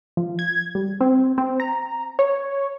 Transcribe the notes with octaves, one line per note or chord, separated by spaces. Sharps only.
F3
G#6
G3
C4
C4
A#5
C#5